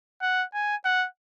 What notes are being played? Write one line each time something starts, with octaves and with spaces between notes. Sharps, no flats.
F#5
G#5
F#5